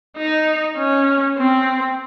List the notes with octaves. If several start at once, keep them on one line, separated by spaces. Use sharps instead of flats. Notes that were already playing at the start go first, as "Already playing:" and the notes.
D#4
C#4
C4